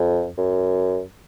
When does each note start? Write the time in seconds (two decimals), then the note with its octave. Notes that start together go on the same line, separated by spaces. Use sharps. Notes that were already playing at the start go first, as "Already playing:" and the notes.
Already playing: F2
0.38 F#2